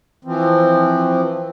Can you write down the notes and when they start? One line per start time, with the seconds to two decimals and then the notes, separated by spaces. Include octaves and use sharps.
0.25 E3 F3 C4